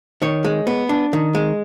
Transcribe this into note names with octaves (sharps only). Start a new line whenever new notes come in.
D#3 C#5
G#3
B3
D4
D#3
G#3